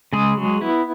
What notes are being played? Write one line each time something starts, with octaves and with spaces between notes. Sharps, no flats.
C#3 G#3 G#4
F#3
B3 E4